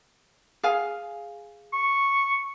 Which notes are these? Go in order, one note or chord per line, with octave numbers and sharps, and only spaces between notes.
G#4 F5 G#5
C#6